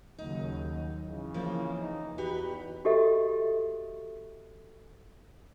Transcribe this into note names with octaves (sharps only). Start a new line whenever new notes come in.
D#2 C#3 F#3 D#4
C#3 E3
F3 A#3 C4
D#4
E2 D#4 F#4 G4 B4
F#4 G4 A4 D#5 E5